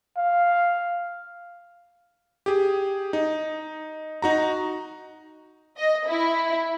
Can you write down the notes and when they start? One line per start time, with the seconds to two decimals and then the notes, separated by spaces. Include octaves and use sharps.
0.18 F5
2.46 G4 G#4
3.13 D#4
4.22 D#4 F#4 A#5
5.78 D#5
6.07 E4